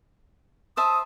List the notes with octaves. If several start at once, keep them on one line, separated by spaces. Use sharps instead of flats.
C5 E5 A5 D#6